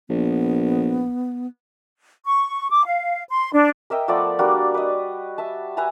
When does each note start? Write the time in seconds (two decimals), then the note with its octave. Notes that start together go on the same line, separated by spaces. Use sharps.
0.09 A#1 B3
2.25 C#6
2.70 D6
2.86 F5
3.29 C6
3.52 D4
3.90 A#4 D#5 E5 G5
4.08 F3 A3 B3 D5
4.39 G3 A#3 D4 F#4
4.74 B4 D#5
5.38 E5 A5
5.77 B4 E5 G#5 A#5